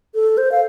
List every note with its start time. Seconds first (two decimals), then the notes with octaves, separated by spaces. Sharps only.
0.15 A4
0.38 C5
0.52 F5